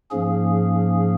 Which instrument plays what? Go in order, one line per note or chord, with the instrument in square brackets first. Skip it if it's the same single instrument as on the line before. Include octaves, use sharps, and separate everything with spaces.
[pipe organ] G#2 F3 A#3 C#4 G#4